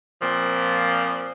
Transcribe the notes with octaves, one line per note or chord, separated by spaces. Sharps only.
A#2 F3 C4